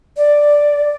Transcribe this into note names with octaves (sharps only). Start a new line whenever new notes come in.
D5